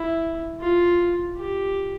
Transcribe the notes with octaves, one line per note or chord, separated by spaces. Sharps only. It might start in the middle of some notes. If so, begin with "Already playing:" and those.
Already playing: E4
F4
G4